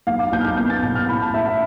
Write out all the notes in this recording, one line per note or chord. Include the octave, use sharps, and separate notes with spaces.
B1 F5
D6
B1 G6
F6
G6
B3 G6
A6
B2 G6
F6
A2 B5
A5
A2 E5
E5